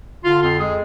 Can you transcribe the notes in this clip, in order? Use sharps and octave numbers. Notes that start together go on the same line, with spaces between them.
D3 F4
F2 F4
G#3 G#4